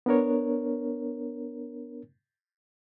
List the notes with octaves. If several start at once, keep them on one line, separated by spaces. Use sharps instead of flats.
B3 D4 A#4 C#5